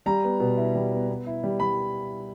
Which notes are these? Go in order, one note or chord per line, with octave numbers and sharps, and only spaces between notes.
G3 A#5
B3
B2
E4
G3
B3
B3
E4
G3
G3 B5